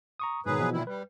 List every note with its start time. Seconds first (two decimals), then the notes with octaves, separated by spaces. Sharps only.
0.20 A#5 C#6 D#6
0.46 G#2 B2 D#3 F#3 G#4 B4
0.60 B2 E3 F3
0.72 A#2 D#3 E4
0.87 G3 B4